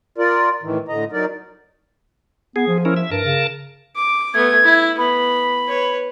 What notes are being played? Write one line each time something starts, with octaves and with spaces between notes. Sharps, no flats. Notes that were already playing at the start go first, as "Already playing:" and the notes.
F4 A#4 D5
A2 D#3 E3
A2 D3 D#5 A#5
F#3 D#4 A#4 D5
B3 G#4
F3
C#4 E4 A#4
E5
G2 A#4 A5
C#3
D6
A3 B3 G#6
E4
B3 B5
B4 C#5